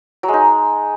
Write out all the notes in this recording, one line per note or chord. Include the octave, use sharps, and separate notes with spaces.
F#3
G#3
D#4